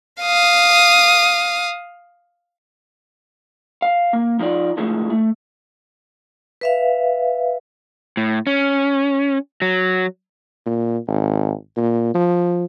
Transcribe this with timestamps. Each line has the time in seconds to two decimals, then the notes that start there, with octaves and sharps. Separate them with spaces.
0.22 F5 D#6
3.82 F5
4.13 A#3
4.39 F3 D#4 F4 D5
4.77 D3 D#3 F3 G#3 A3 E4
5.10 A3
6.61 B4 E5 F5
8.17 A2
8.47 C#4
9.62 F#3
10.66 A#2
11.07 G#1
11.77 A#2
12.15 F3